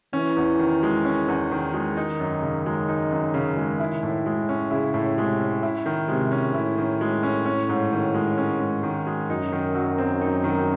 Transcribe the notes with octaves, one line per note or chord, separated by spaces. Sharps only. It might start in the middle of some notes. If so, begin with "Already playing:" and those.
E3 C#4
E2
D#3
G#3
C#4
E2
D#3
G#3
D#3 D#4
F#2
C#3
G#3
D#4
F#2
C#3
G#3
E4
A2
G#3
C#4
C#3 E4
A2
C3 G#3
C#4
E4
D#3
C3 G#3
C#4
A2 E4
D#3
G#3
C#4
C#4
G#2
D#3
G#3
C#4
G#2
D#3
G#3
F#2 D#4
D#3
F#3
C4
D#4
D#3